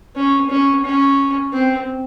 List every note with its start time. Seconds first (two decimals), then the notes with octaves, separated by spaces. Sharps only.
0.16 C#4
0.50 C#4
0.85 C#4
1.53 C4